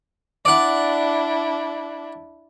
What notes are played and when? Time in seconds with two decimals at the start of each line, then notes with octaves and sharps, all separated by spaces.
0.45 D4 E4 D5 F#5